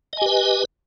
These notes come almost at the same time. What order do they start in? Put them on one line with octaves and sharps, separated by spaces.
D#5 G#5 G4 B4